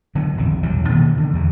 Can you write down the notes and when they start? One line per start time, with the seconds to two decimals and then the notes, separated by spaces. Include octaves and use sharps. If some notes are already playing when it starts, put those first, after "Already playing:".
0.15 D3 F#3 B3
0.37 A#1 F2 D#3
0.63 B1 E2 F#3 G3
0.88 B2 D#3 A#3 B3
1.17 D3 E3
1.33 E2 G2 E3